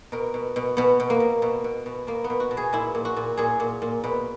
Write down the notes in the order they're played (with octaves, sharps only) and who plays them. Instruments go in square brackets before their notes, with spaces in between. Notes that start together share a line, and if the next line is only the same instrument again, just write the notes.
[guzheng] B2 A#4
B2
B2
B2 B3
B2
A#3
B2
B2
B2
B2
B2 A#3
B3
B2
F#4
B2
G#4
A#2 E4
A#2
F#4
A#2
A#2 G#4
A#2
A#2
B2 B4